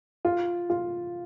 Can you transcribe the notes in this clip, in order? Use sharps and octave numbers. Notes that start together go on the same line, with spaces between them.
F4
F4